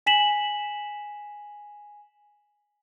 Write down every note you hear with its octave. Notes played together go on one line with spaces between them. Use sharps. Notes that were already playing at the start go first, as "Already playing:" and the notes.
G#5 B6 E7 F#7